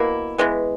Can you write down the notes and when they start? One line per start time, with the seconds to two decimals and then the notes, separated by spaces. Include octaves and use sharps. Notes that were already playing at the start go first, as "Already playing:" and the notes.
Already playing: B2 A#3 E4
0.38 E3 G#3 B3